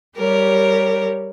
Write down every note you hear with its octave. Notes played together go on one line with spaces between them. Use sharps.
G3 G4 A#4 C#5